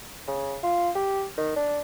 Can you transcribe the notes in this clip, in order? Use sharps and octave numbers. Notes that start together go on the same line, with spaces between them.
C#3
F4
G4
D#3
D4